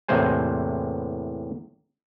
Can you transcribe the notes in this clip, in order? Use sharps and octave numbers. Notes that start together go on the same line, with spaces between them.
E2 A2 C3 A#3 C5 G#5